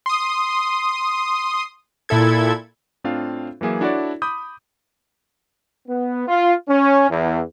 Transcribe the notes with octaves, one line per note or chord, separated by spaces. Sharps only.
C6 D#6
A#2 E4 A4 G#6
A2 C4 D4 F4 F5
E3 F#3 A#3 G#4 E5
D4 E4 F#4 A4 C#5 D5
B5 D6 D#6 G6
B3
F4
C#4
E2